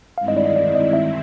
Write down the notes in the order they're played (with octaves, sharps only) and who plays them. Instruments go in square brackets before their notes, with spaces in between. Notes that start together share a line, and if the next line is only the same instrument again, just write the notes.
[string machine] G2 D#3 G#3 C4 E4 [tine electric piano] F5
[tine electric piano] D#5
D5
D#5
D5
D#5
E5